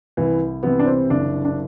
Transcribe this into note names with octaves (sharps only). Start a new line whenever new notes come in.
C2 E3
C3 E3 B3
D4
C4
F#1 D4
D4